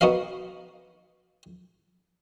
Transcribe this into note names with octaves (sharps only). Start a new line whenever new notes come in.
B3 D#4 F#4 D#5 F5